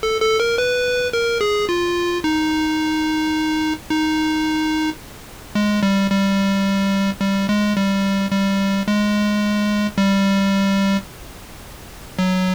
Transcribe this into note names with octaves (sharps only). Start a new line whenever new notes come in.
A4
A4
A#4
B4
A#4
G#4
F4
D#4
D#4
G#3
G3
G3
G3
G#3
G3
G3
G#3
G3
F#3